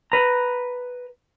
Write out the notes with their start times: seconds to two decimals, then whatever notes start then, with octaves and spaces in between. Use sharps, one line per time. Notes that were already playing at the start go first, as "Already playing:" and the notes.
0.12 B4 A#5